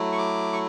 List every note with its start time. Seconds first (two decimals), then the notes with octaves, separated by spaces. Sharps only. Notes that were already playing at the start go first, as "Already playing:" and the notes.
Already playing: F#3 A3 E4
0.12 C#6
0.18 D6
0.53 C#6